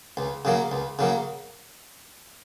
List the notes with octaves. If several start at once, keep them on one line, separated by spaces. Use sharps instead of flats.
C#2
C#3 F#3 A#3
C#2
C#3 F#3 A#3